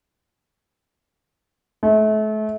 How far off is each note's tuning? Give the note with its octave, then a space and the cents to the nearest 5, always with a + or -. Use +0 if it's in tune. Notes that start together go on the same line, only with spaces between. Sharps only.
A3 -35